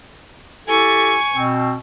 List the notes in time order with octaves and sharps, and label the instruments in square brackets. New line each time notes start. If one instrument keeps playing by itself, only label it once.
[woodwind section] E4 G4 A4 [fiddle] G#5 C#6
[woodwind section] B2 C4